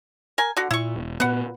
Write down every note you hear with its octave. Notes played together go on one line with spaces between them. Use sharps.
A#4 G#5
D3 F#4
A#2 E4 C#6
E1
A#2 B3 B4 F#5